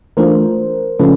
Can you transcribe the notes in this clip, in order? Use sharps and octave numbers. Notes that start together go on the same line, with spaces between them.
E3 A3 D4 F4 A#4 C5
C#3 F3 A3 C#4 F4 A4 B4